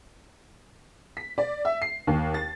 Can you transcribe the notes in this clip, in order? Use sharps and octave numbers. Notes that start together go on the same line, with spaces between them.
B6
D5
E5
C7
D#2
A6